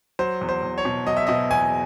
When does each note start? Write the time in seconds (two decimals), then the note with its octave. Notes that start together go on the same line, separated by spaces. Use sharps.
0.19 F#3 C5
0.41 E2
0.49 C5
0.63 E2
0.78 C#5
0.85 B2
1.07 F#3 D#5
1.17 E5
1.27 B2 D#5
1.50 E2 G#5